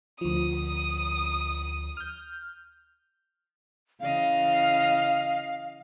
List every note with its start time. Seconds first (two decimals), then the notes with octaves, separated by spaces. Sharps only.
0.21 D2 F3 D#6
1.97 F6 G6
4.00 C#3 E3 D#5 F5